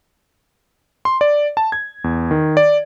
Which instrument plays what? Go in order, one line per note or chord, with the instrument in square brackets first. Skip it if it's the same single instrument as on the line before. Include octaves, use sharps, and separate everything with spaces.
[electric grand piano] C6
D5
A5
G#6
E2
D#3
D5